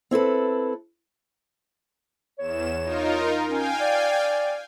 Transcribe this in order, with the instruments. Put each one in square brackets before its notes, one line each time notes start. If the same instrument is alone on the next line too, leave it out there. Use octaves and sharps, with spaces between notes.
[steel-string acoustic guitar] C4 E4 A4 B4
[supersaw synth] E2 E7 [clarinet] C#5
[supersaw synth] D#4 F4 A#4
[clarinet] C#4 [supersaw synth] F5 G5 G#5
[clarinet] D5